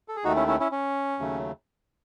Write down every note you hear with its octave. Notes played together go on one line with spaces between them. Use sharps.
A4
G#4
D#2 D#3 A3 D#4 F#4
C#4 E4
C#4 E4
C#4 E4
C#4
D#2 C#3 F#3 A3